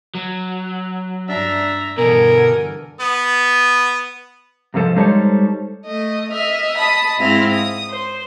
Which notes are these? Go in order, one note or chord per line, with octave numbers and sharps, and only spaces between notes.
F#3
G2 D4 E5 A#5
G2 B2 D3 E3 A4 A#4 G#5
B3
C2 G#2 F3 A4 C5
G3 G#3 D#4 A4 C5 C#5
A3 D#5
D#5 E5 F6
D#5 A5 B5 D#6
G#2 C4 E4 F5 A#6
D#6
C5